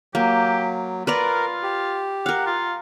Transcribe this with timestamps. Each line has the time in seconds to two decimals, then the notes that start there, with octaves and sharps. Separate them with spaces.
0.15 F#3 A#3 G4
1.07 F4 A#4 B4 D5 A#5
1.63 G4
2.26 A#4 F5 F#5
2.47 F4